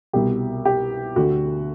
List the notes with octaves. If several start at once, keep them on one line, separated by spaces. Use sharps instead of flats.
C2 B2 G4
G4
D2 D3 F#4